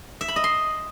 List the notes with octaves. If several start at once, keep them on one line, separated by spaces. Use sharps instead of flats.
E5
B5
D#5
C6